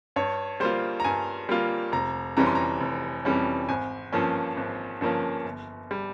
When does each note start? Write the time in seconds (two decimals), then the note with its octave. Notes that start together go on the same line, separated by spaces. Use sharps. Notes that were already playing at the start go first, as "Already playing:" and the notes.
0.16 G2 C#5
0.60 G3 A#3 F4 C5
1.00 A#5
1.04 G2 G#5
1.49 G3 A#3 F4
1.92 F1 A#5
2.37 F2 E3 G3 C#4 A#5
2.46 C6
2.55 A#5
2.80 F1
3.25 F2 E3 G3 C#4
3.69 G#1 G#5
4.12 G2 F3 A#3 C#4
4.57 G#1
5.01 G2 F3 A#3 C#4
5.45 G1
5.91 G3